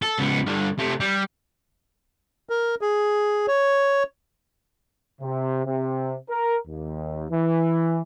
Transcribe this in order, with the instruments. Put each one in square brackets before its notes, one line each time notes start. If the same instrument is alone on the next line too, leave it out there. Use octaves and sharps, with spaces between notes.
[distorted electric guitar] A4
C#2 B3
G2 D3
C3 A3
G3
[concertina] A#4
G#4
C#5
[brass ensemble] C3
C3
A#4
D#2
E3